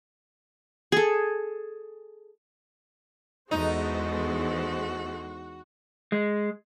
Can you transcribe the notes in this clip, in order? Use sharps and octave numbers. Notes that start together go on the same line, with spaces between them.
G#4 A4
E2 G#3 D#4 F#4 A4 C5
G#3